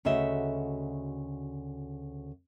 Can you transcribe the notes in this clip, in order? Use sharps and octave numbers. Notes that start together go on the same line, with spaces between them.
D2 C#3 F#4 D#5 E5